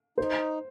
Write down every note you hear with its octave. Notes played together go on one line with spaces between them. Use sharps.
D#4 C5